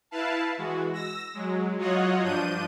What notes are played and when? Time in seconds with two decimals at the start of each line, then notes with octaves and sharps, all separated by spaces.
0.11 E4 B4 F5 A5
0.58 E3 G#3 F#4
0.93 E6 A#6
1.34 F#3 G#3
1.77 F#3 F4 F#4 C#5 D#5 F#5
2.23 G2 F3 D4 G6 D#7